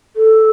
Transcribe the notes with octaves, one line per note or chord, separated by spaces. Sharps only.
A4